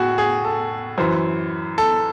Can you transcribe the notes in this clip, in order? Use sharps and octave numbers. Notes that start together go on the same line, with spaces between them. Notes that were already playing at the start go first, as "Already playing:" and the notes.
Already playing: A2 F#4 G#4
G#4
A4
F#2 E3 C5
A4